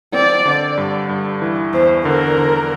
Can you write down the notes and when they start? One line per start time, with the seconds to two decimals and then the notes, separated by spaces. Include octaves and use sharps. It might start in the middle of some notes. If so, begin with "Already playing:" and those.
0.14 C4 D5
0.45 D3
0.78 G2
1.09 G2
1.42 E3
1.73 E2 C5
2.05 D3 A#4
2.38 D3